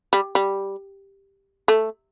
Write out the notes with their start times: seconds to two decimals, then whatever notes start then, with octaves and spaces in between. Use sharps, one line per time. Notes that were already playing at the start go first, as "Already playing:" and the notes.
0.13 G3
0.35 G3
1.68 A3